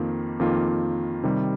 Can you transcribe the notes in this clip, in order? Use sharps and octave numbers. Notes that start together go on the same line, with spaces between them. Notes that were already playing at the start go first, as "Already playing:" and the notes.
Already playing: F2 D#3 A#3 F4
F2 D#3 A#3 F4
C3 D#3 G3